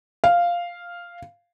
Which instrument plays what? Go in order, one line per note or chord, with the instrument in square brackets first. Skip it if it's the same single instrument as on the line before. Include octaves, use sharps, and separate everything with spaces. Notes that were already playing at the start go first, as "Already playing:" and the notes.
[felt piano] F5